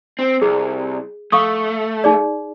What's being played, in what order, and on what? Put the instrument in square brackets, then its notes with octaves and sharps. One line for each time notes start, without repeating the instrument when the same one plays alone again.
[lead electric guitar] C4
[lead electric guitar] C2 [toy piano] G#4
[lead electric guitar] A3 [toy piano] F5 C#6 D#6
[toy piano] D#4 G#4 D5